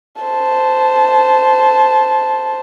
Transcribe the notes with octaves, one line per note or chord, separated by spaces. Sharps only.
C5 A5